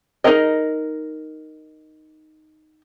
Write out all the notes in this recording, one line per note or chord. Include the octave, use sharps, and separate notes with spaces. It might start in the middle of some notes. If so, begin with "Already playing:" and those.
D#4 F4 G#4 A#4 D#5